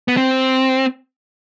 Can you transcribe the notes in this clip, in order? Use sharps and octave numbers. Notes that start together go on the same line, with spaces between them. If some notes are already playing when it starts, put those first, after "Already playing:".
B3
C4